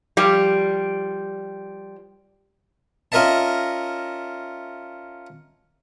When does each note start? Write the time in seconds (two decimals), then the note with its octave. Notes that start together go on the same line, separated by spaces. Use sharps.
0.17 F3 G3
3.12 C#4 F4 A#4 D#5 E5 A5